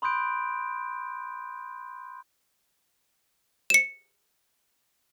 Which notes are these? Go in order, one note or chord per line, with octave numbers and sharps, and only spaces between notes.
B5 C6 D#6 F#6 G6 D7
C#7 E7